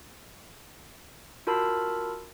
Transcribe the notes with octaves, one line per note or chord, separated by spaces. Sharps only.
F4 F#4 A#4 A5 B5 E6